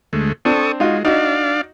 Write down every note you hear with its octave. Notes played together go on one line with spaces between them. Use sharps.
D2 G#3 A3
C4 D4 A4 C#6 D#6
G#3 D#4 F4 F#4
D4 D#4 F#4 D5 F5